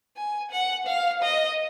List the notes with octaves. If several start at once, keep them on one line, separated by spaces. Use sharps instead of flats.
G#5
F#5
F5
D#5